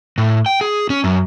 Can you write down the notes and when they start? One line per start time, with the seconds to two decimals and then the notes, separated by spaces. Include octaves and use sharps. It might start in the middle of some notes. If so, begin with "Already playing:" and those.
0.18 A2
0.46 G5
0.61 G#4
0.90 C#4
1.04 F#2